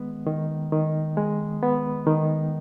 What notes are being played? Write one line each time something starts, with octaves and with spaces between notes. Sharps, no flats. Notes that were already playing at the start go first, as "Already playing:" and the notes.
Already playing: D#3 G#3 B3
D#3
D#3
G#3
B3
D#3